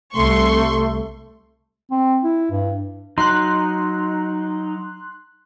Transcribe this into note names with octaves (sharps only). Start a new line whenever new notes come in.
C2 A3 C6 C#6
C4
E4
G2
F#3 D#4 C6 F#6